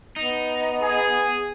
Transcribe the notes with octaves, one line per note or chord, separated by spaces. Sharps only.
B3 D#4
G#4